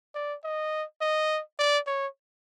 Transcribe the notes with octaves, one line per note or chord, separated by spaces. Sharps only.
D5
D#5
D#5
D5
C#5